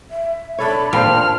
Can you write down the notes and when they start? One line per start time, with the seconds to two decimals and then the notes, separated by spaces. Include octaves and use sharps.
0.11 E5
0.59 D4 A4 C#5 B5
0.93 A#2 C4 C5 A5 F6